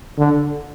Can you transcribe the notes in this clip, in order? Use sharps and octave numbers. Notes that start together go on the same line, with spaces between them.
D3